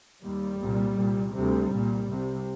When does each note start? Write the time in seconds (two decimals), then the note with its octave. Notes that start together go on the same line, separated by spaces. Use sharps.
0.22 D#2 G3
0.60 C2 A#2
0.97 C2 A#2
1.33 D2 C3 G3
1.71 C2 A#2
2.07 C2 C3